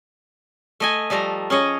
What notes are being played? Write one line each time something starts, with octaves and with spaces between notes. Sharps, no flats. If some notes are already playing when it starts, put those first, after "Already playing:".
A3 D#5 G#5
F3 G3 A3 A#5
C#4 G#4 C#5 D#5